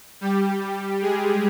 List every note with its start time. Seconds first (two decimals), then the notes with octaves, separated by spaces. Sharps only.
0.21 G3 G4
1.02 G#3 G#4